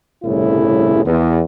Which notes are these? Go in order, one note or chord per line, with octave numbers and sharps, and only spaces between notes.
G1 C2 A2 C#3 E4
E2